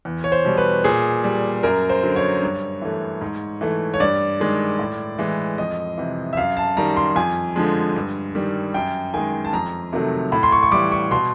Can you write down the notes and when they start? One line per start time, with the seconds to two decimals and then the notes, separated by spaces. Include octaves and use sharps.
0.05 E2
0.24 C#5
0.32 C5
0.45 B2 G3
0.58 B4
0.84 A#2 G#4
1.24 G3
1.63 F#2 A#4
1.89 C5
2.03 D3 F#3
2.16 C#5
2.42 G2
2.82 E3 A3
3.21 G#2
3.61 E3 A3
3.94 C#5
4.00 G2 D5
4.40 D#3 G#3
4.79 A2
5.19 E3 G#3
5.58 F2 D#5
5.97 C3 E3
6.33 E5
6.37 F#2 F5
6.57 A5
6.77 D#3 G3 A#5
6.97 C6
7.16 F2 G#5
7.56 D3 F3 G#3
7.96 G2
8.35 D#3 G3
8.74 F#2 G5
9.14 D#3 G#3 G#5
9.45 A5
9.53 F2 A#5
9.93 C3 D#3 F#3 A3
10.32 A2 B5
10.43 C6
10.52 C#6
10.63 C#6
10.71 E3 G3 D6
10.92 C#6
11.11 B2 C6